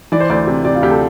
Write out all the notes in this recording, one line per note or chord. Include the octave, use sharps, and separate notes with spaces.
E3 D5
C5
D2 D5
C3
C3 D5
F4
D2 G4
A4